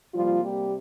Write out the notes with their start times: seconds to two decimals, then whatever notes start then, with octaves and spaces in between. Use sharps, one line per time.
0.14 C3 F3 G3 A#3 F4
0.43 G3 G4